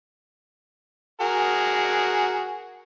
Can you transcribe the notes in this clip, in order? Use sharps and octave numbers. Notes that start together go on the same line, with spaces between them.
F#4 G#4 A#4